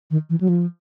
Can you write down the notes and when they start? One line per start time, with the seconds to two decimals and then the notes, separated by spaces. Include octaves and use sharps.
0.11 D#3
0.30 E3
0.41 F#3
0.49 F3